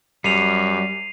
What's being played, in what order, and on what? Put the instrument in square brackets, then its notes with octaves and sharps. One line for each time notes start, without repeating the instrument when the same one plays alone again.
[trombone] F#2 [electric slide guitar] G3 [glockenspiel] C7 D#7 F7